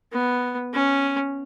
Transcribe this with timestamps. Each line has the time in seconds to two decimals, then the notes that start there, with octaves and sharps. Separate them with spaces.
0.12 B3
0.74 C#4